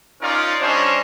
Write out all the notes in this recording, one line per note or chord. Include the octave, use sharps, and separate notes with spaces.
C#4 D#4 F4 A#4 D5
G3 C#4 D4 C5 C#5 D#5